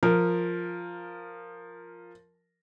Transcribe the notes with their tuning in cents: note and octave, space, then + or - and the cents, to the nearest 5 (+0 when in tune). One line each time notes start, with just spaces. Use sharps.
F3 +0 A#4 -5